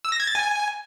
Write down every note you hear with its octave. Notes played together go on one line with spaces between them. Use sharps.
E6
A#6
G#6
A6
G#5